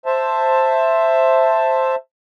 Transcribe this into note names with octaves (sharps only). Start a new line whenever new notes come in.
C5 E5 A5